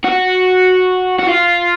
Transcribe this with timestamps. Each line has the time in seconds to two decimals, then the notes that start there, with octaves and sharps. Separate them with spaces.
0.05 F#4
1.19 F#4
1.29 F4